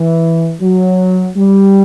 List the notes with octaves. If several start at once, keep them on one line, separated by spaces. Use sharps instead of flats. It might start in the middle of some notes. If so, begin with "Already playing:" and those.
Already playing: E3
F#3
G3